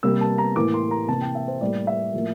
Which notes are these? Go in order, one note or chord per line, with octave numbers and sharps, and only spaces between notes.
C3 G3 A#3 E6
A5
A#5
A2 E3 A#3 D6
C6
A#5
C3 E3 A#3 A5
G5
E5
C5
A2 G3 A#3 D5
E5
A2 F3 A#3